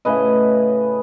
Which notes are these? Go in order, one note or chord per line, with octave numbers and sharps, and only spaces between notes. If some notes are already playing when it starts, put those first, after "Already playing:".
A2 C#3 B4 D#5